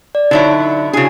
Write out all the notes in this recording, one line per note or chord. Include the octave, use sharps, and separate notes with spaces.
D5
D3 F#3 D#4 E4
C#3 D4 E4 F#4 G#4